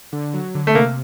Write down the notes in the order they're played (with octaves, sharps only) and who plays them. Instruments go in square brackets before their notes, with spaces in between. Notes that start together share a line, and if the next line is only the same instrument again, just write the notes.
[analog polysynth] D3
F#3
D3
[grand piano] A3
[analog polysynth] C3 [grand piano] A#3